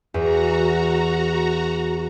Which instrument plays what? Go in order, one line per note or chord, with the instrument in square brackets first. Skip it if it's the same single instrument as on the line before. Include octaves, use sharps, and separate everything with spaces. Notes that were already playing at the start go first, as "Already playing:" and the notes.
[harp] E2 [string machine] F#4 A#5